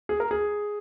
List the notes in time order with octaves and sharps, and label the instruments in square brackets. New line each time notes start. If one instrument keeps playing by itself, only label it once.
[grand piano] G#4
A#4
G#4